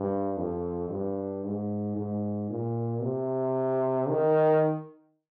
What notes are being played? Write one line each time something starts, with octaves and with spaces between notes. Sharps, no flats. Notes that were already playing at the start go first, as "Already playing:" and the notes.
Already playing: G2
F2
G2
G#2
G#2
A#2
C3
D#3